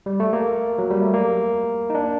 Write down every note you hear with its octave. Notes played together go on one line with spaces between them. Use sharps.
G3
A3
A#3
F#3
G3
A3
A#3
D#4
D4